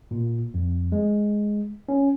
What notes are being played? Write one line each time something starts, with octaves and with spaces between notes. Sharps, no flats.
A#2
F2
G#3
C#4